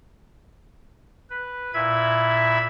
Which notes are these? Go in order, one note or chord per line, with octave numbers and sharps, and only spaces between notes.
B4
A#2 E4 E5 B5 G#6